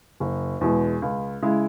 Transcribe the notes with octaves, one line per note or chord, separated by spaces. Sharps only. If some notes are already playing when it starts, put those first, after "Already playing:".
F#1
E2 B2 G#3
C#2
C#3 G#3 E4